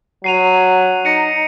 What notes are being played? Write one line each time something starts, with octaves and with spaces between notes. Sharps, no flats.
F#3 C7 D#7 F7
D#4 A#6 C#7 D#7